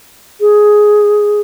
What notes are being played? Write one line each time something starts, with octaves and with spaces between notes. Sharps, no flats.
G#4